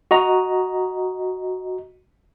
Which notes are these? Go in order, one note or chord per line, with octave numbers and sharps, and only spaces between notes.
F#4 D#5 A#5